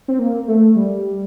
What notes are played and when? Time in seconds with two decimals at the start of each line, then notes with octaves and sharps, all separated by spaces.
0.08 C4
0.19 A#3
0.48 A3
0.76 G3